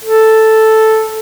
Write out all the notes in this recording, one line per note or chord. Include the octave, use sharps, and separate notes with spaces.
A4